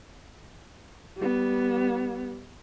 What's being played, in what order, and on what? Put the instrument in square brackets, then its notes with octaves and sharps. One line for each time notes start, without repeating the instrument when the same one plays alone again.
[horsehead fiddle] G3 B3